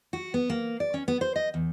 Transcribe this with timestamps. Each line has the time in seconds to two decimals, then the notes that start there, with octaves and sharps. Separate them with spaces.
0.13 F#4
0.34 B3
0.50 A#3
0.80 D5
0.94 C#4
1.08 B3
1.21 C5
1.36 D#5
1.54 E2